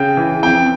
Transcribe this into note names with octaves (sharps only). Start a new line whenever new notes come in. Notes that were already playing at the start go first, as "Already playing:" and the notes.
Already playing: C#3 G5
E3
F2 G5